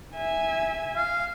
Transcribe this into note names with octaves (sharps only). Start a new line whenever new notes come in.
E5 G#5
F5